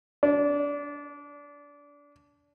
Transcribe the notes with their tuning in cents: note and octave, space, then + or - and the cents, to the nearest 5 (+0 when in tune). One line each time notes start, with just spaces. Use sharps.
D4 -25